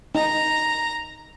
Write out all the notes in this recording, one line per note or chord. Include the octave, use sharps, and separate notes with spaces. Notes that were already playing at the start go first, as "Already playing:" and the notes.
D#4 A#5